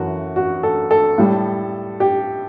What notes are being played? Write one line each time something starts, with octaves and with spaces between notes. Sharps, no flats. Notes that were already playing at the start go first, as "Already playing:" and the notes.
Already playing: F#2 E3 A3 F#4
F#4
A4
A4
A2 G3
G4